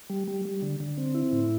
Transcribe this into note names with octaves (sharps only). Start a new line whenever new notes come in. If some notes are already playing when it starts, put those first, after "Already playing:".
G3
G3
G3
D3
D3
C4
E4
A2